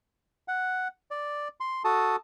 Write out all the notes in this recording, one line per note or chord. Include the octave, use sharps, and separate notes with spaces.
F#5
D5
C6
F#4 A4 A5 D#6